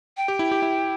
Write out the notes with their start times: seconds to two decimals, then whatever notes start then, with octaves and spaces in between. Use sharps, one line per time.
0.17 G5
0.28 G4
0.39 E4
0.52 G4
0.62 E4